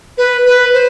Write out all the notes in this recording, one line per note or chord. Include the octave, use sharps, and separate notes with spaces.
B4
B4
C5